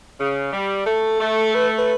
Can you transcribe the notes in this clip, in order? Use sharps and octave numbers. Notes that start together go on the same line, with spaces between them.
C#3
G3
A3 A4
A3
B4
B4